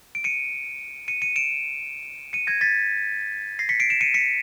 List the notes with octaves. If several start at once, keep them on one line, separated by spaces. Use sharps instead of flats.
D7
C#7 D#7
C#7 D#7
C#7 D#7
D7 E7
C#7 D#7
G#6 A#6
A6 B6
A#6 C7
B6 C#7
C7 D7
D7 E7
C#7 D#7
B6 C#7